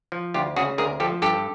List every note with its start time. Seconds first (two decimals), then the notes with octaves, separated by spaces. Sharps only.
0.12 F3
0.34 D2 F4 G4
0.56 C#3 F#4 G#4
0.78 D2 G#4 A#4
1.00 F3 G4 A4
1.22 G2 G4 A4